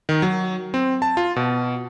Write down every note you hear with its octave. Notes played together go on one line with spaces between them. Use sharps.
D#3
F#3
C4
A5
F4
B2